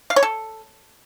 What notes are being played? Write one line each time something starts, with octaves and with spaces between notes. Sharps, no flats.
F5
C#5
A4